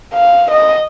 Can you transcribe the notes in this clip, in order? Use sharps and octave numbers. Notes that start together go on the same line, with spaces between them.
F5
D#5